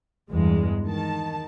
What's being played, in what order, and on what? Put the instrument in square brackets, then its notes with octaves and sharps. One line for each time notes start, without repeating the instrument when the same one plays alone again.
[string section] E2 G2 G#3
D#3 A5